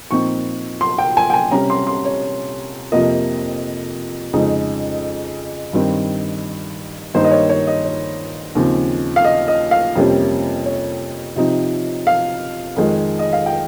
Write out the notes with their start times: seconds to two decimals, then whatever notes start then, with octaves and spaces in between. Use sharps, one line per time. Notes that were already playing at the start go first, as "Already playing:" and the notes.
0.11 A#2 F3 C4 D#4 C#6
0.81 C6
0.98 G5
1.17 G#5
1.30 G5
1.34 G#5
1.52 C3 G3 C#4 A#5
1.70 C6
1.87 C6
2.05 C#5
2.92 F2 C3 F3 A#3 D#5
4.33 F2 C#3 G#3 D#4
5.73 G2 D#3 G3 C4
7.14 G2 D#3 A#3 D#4 C5
7.25 D#5
7.31 C#5
7.49 C#5
7.67 D#5
7.85 C#5
8.55 D#2 C#3 F3 C4
9.16 F5
9.24 D#5
9.48 D#5
9.71 F5
9.95 F2 C3 G3 A#3 C#4
10.66 C#5
11.36 C3 F3 C4 D#4
12.07 F5
12.76 F2 D#3 G#3
13.19 D#5
13.33 F5
13.46 G5